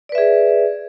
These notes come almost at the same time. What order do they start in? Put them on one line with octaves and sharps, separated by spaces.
D5 B4 E5 G#4